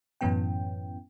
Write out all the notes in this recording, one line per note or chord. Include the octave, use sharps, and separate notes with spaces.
F#2 A2 E3 B3 C#4 G5